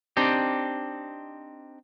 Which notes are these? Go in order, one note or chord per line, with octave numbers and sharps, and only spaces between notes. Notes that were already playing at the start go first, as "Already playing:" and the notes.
C4 D4 D#4 G4